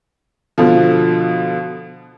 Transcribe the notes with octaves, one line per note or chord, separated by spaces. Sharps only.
B2 D3 F3